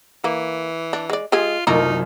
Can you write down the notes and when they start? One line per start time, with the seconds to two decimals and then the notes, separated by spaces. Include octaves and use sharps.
0.24 E3 A#3
0.93 D4
1.10 G#3 D5
1.32 G#3 F4 G4 G#4
1.67 F#1 C2 A3 A#3 D#4 F4 A#4